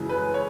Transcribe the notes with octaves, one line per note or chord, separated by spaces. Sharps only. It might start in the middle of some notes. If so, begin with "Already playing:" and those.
Already playing: F#2 C#3 E3 G#3
B4
C#5